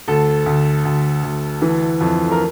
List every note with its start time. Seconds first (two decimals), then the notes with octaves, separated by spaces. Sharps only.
0.08 D2 A4
0.46 D2
0.85 D2
1.23 D2
1.62 E3
2.01 F2
2.31 A#4